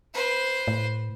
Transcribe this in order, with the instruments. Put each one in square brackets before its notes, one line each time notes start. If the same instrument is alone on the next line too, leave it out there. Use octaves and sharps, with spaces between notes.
[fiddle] B4 C5
[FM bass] A2